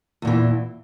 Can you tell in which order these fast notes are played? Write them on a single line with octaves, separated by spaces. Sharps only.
E2 A#2 E3